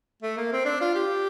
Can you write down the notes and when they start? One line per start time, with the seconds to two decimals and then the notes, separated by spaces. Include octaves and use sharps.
0.22 A3
0.37 A#3
0.52 C4
0.65 D4
0.81 F4
0.95 G4